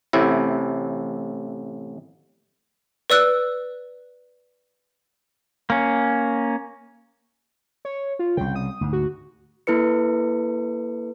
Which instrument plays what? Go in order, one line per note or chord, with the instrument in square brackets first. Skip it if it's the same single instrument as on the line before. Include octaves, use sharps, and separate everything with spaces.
[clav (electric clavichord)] A1 A2 C3 E4
[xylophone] B4 D5 E6 F#6
[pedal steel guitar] A#3 C#4
[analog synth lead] C#5
F4
[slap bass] C2 C#3 [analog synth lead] G5
[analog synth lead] D#6
[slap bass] D2 G#2
[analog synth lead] F#4
[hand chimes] A#3 E4 A4 B4 C#7